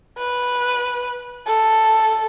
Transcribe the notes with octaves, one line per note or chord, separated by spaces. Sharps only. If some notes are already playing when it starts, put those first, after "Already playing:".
B4
A4